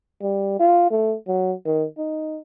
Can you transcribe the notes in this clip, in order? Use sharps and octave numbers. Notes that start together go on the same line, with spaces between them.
G3
F4
A3
F#3
D#3
D#4